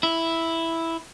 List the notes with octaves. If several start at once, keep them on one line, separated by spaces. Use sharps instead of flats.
E4